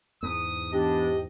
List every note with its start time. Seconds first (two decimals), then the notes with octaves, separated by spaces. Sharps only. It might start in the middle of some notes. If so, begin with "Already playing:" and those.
0.23 E2 G#2 D#6
0.72 E3 B3 D4 G4 D#5